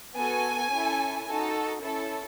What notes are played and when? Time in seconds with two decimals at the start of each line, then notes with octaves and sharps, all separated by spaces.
0.16 B3 F#4 A4 G#5
0.72 C#4 E4 A4
1.27 D#4 F#4 A4
1.83 C#4 E4 A4